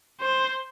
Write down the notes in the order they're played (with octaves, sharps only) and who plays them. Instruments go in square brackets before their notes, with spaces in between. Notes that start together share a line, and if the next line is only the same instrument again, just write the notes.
[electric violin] C5